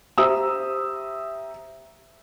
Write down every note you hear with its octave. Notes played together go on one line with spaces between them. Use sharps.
G4 C5 E5 A#5 D#6 E6